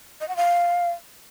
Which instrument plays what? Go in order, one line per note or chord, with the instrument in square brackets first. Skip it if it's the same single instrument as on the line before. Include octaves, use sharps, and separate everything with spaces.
[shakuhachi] D#5
F#5
F5